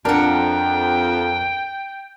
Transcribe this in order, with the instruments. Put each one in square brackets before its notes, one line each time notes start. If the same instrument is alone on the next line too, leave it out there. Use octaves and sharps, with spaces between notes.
[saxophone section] F2 [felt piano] D4 [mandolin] A#4 F#5 [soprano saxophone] G5